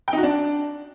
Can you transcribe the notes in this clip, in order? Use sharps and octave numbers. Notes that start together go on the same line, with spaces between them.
G5
D#4
F#4
D4